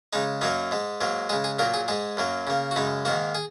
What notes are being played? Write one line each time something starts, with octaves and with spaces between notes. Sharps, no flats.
C#3 G#3 D#4
F#2 F#3 A#3 D#4
G#2 G#3
G#2 F#3 A#3
C#3 G#3 G#4
G#4
A#2 F#3 A#3 A#4
G#4
G#2 G#3 G#4
F#2 F#3 A#3
C#3 A#3
F#4
F#2 C#3 G#3 D#4
G#2 D#3 A#3 F#4
G#4